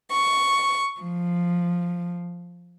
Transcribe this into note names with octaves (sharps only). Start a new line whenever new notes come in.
C#6
F3